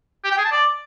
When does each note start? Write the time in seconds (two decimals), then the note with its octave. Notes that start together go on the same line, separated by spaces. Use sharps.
0.24 G4
0.31 G5
0.38 G#4
0.44 A5
0.51 D5